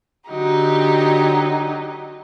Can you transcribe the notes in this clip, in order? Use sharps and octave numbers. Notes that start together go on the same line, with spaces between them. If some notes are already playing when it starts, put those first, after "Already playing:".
D3 F#3 D#4 G4